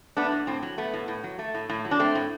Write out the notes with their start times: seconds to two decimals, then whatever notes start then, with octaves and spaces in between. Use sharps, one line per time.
0.17 A3 B3 D4
0.32 A2
0.47 A2 C4
0.62 F#3
0.78 A3 B3
0.94 A2
1.08 A2
1.24 F#3
1.39 A3
1.54 A2
1.70 A2
1.85 F#3
1.91 D4
2.00 A3 C4
2.15 A2